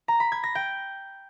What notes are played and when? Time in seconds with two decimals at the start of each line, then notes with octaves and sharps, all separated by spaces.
0.08 A#5
0.20 B5
0.32 G#6
0.44 A#6
0.55 G5